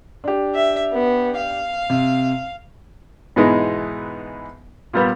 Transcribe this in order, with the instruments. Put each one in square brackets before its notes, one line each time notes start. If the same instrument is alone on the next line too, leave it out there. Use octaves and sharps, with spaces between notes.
[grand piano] D4 G4
[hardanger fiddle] E5
B3
F5
[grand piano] C3
[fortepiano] G#2 B2 E3 G#3 B3 D#4
A#2 G3 B3